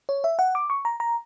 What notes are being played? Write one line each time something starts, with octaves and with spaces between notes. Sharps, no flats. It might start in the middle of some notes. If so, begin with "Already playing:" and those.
C#5
E5
F#5
D6
C#6
A#5
A#5